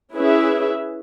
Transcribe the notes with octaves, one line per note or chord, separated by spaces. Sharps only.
C#4 E4 G#4 B4 E5